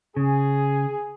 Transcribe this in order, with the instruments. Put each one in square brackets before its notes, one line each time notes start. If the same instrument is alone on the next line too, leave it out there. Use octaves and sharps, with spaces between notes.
[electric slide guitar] C#3 [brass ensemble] G#4